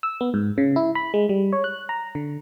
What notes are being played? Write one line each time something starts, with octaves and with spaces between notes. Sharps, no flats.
E6
B3
G#2
C#3
E4
B5
G#3
G3
C#5
F#6
A#5
D3